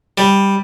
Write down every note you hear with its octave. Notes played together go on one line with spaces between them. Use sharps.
G3